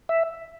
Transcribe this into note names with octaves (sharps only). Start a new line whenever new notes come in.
E5